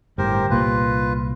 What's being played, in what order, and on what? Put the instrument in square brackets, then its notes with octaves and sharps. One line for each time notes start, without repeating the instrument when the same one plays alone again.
[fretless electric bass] G1 A2 [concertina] G4 A#4 C5
[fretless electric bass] C2 A#2 A#3 [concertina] F4 B4